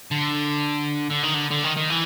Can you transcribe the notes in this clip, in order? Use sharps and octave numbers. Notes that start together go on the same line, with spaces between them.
D3
D3
D#3
D3
D3
D#3
D#3
E3